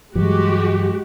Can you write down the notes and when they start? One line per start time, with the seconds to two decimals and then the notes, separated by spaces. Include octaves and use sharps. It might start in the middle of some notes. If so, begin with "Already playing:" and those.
0.15 G2 E3 F#3 G#3 F#4 G4